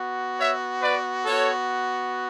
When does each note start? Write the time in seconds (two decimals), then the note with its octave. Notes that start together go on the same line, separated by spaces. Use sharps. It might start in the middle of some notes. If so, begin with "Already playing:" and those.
Already playing: B3 F#4
0.37 C#5 E5
0.81 B4 D5
1.25 B3 F#4 A4 C#5